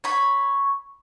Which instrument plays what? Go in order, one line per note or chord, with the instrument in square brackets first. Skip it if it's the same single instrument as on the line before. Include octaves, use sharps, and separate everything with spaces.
[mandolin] C#5 B5